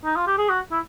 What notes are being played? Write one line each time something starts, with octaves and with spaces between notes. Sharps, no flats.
D#4
F4
G4
G#4
F#4
E4